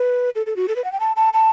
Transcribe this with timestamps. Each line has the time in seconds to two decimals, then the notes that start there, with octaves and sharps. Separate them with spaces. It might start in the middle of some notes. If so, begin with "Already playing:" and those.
Already playing: B4
0.35 A4
0.46 A4
0.56 F#4
0.68 A4
0.76 B4
0.84 F#5
0.92 G5
1.00 A5
1.16 A5
1.33 A5